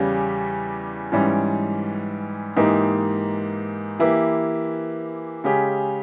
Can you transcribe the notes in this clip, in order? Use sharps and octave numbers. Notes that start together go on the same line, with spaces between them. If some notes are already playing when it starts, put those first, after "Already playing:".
Already playing: E2 C#3 G3 C#4 G4
G#2 E3 G3 C#4
G#2 E3 A#3 D#4 G4
E3 A#3 E4 G4
C#3 G#3 C#4 G4